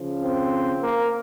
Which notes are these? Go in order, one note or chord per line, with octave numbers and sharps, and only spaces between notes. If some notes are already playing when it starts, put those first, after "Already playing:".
Already playing: C#3 F3
C4
A#3